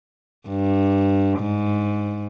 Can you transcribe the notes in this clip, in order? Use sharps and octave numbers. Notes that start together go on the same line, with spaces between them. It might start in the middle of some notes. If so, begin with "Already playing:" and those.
G2
G#2